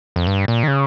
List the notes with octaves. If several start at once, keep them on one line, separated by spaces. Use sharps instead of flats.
F2
G2
A#2
D#3
C#3